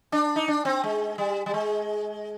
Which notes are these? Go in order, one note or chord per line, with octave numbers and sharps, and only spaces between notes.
D4
D#4
D4
C4
G#3
G3
G3
G#3